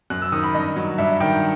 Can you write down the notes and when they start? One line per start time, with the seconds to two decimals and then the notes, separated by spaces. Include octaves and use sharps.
0.10 F#2 F#6
0.22 E6
0.32 D#3 D#6
0.44 B5
0.54 G2 D#5
0.76 F#3
0.98 G2 E5
1.20 D#3 G5